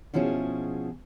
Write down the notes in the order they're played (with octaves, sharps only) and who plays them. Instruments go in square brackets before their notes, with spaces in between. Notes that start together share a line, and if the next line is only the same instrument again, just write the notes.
[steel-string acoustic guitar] B2 F3 C#4 E4 G#4